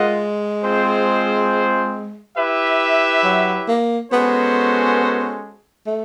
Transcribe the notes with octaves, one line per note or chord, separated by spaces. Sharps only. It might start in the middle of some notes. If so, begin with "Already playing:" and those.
Already playing: G#3 F4 A#4 D#5 F#5
C4 F4 G#4 C5
E4 G4 B4 E5
F#3
A#3
G#3 B3 C#4 F#4 A4 C5
A3